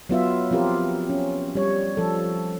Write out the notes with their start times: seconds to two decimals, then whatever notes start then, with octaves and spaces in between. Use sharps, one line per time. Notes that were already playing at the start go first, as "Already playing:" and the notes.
0.09 F#3 B3 F4 E5
0.51 F3 C4 F4 G4 A#4
1.10 C#4
1.55 G3 C#5
1.97 F3 A4